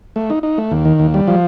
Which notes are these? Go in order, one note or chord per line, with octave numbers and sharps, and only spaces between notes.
A3
D#4
D#4
A3
D#2
D#3
D#2
G3
F3